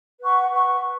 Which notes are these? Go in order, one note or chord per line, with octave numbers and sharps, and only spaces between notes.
B4 F#5 C#6
B4 F#5 C#6
B4